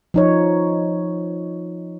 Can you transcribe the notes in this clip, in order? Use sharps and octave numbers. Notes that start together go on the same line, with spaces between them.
F3 D#4 C#5